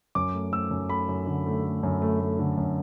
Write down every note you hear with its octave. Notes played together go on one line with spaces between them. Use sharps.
F#2 D6
A3
A3 E6
F#2
A3 B5
F#2
D3
A3
A3
F#2
A3
A3
D3
F#2